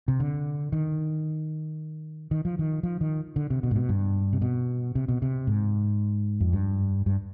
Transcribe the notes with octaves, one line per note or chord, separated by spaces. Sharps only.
C3
D3
D#3
D#3
F3
D#3
F3
D#3
D3
C3
B2
G#2
B2
G2
C3
B2
C3
B2
C3
G#2
F2
G2
G2